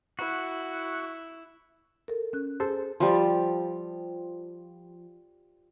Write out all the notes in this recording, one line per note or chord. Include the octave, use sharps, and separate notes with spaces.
E4 F#4
A4 A#4
C#4 F#6
G#4 A4 C5
F3 G3